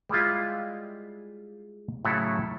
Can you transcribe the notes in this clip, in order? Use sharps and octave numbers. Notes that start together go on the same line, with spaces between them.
G3 G#3 E4 F4
A2 C#3 F#3 E4 A4